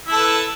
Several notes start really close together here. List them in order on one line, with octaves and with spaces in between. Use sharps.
E4 A4 B4